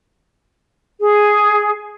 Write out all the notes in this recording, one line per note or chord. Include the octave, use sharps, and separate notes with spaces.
G#4